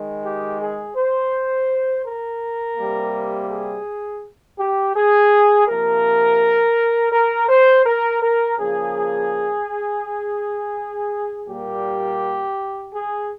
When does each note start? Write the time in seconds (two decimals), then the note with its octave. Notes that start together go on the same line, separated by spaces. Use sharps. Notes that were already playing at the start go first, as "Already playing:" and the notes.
Already playing: D#3 G#3
0.23 G4
0.60 G#4
0.96 C5
2.05 A#4
2.77 C3 G3 A#3
3.49 G#4
4.59 G4
4.95 G#4
5.67 C3 F3 A#3 A#4
7.12 A#4
7.49 C5
7.85 A#4
8.21 A#4
8.57 C#3 F3 A#3 G#4
11.47 A#2 G3 A#3 G4
12.93 G#4